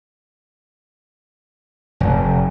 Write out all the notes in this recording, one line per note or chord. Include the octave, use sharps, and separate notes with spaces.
F1